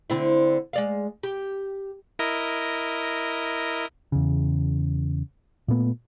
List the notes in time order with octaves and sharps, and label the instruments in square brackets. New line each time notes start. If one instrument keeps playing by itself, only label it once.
[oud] D3 C4 E4
G#3 D5 F5
G4
[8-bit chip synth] E4 A#4 D#5
[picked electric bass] E2 C#3
A#2 A3 B3